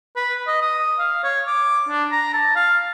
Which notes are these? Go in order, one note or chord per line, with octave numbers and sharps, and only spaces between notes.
B4
D#5
D#6
F5
C#5
D6
D4
A#5
A5
F5